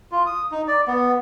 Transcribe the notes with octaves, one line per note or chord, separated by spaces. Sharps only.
F4
D#6
D#4
D5
B3